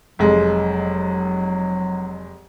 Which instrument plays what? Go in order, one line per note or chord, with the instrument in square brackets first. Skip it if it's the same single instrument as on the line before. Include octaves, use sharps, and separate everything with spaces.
[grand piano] F1 G#3 [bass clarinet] F#3